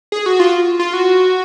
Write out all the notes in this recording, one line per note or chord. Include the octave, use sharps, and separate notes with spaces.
G#4
F#4
F4
F4
F#4